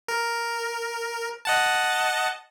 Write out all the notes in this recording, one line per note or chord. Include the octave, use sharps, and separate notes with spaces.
A#4
D#5 F#5 A5